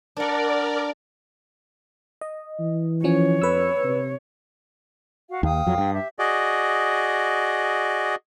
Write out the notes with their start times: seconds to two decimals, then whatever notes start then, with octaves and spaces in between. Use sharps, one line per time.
0.17 D4 A#4 D5 F#5
2.21 D#5
2.60 E3
3.04 F3 C#4 C#5
3.42 F2 B4 E6
3.84 C3
5.29 F#4 F5 F#5
5.43 D#2 F5 G5 D#6
5.67 F2 F#3
5.78 G2
5.94 G4 E5
6.19 F#4 G#4 D5 D#5